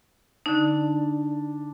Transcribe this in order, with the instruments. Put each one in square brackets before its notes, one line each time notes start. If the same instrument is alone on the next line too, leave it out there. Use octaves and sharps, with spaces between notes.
[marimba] D3 D#4 [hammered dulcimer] D4